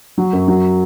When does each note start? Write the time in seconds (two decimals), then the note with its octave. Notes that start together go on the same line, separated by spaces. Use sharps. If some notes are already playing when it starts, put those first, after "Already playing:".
0.18 F#3
0.33 F#2
0.48 F#3